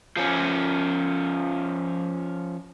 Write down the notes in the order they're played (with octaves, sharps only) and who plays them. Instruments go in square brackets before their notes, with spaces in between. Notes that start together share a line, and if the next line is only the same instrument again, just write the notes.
[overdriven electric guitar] F3 C#4